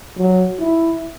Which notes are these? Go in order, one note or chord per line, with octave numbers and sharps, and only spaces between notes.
F#3
E4